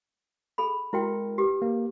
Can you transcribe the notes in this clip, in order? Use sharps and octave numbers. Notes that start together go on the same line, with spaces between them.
G#4 A4 B5
G#3 E4 F#4 A#4 G5
G4 B4 D6
A#3